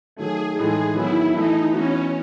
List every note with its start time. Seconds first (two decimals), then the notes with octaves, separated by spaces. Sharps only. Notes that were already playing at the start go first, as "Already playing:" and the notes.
0.16 D#3 F#3 A3 G#4
0.55 A2 E3 G#3 D#4 G#4 A4
0.94 D#3 F#3 B3 E4
1.33 E3 A3 D#4 E4
1.72 E3 B3 C#4 F#4